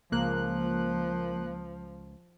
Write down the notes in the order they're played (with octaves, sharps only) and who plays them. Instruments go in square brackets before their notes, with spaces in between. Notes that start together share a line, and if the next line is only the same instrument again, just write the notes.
[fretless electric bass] C#2 [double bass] F3 [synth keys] A#3 F#6